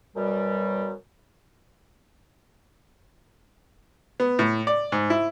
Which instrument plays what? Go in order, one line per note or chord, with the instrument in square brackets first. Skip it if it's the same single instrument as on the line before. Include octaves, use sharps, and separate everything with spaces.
[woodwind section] F#2 B2 G3
[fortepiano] B3
A2
D5
G#2
E4